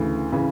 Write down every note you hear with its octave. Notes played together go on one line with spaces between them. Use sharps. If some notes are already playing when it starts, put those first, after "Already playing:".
Already playing: D2 C#3 E3
C#3 E3